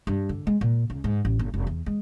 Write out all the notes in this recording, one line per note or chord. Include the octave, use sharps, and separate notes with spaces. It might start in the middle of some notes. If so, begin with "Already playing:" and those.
G2
D3
G#3
A#2
C#2
G#2
A1
G1
F1
E2
G#3